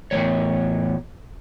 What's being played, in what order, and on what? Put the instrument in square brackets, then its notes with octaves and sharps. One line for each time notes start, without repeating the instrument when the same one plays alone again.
[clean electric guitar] E2 A2 E3 C#5